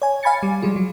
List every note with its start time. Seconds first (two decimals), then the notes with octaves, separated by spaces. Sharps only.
0.02 C#5 G#5
0.23 F5 G#5 B5 G#6 A6 C#7
0.43 G3
0.62 F3 G3 G#3 F4
0.76 F#3